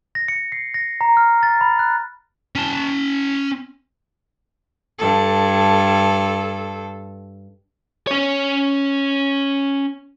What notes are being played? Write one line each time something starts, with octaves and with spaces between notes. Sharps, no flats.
A#6
C#7
C7
A#6
A#5
F6
A6
B5
F#6
C#4 A5
G2 A4
C#4 C#5